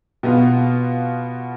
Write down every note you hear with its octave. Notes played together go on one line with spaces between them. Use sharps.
B2 B3 F4